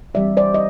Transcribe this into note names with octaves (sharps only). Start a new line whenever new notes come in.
E3 G3 C4 D5 E5
C5 D5
D#5